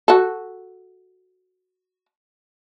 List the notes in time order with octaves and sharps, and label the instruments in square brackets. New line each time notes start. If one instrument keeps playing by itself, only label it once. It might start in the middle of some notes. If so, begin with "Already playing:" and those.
[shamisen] F#4 A4